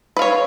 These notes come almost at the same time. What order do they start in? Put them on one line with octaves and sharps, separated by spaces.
B4 F5 C#5